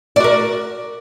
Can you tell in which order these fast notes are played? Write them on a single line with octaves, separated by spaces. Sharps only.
D5 F#4 A#4